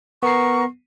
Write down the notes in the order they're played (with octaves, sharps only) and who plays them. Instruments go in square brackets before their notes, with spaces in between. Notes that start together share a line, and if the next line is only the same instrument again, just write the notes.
[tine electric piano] B3 C7 [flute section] A#4 C#6